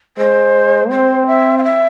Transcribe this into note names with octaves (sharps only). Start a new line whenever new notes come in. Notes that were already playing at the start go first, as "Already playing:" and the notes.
G#3 C5
C4 C5
E5
F5
E5